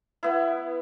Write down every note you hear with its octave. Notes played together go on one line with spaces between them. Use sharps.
B3 E4